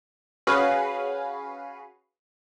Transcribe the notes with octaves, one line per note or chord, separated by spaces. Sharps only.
C#4 F#4 G#4 B4 F5